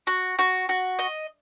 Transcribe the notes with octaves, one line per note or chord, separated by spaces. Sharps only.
F#4
F#4
F#4
D#5